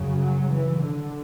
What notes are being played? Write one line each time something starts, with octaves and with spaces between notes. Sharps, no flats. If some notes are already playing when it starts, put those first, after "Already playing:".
Already playing: F#2 C#3
F#3
E3
D3